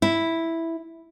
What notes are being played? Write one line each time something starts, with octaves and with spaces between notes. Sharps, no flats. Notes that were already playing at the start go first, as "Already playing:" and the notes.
E4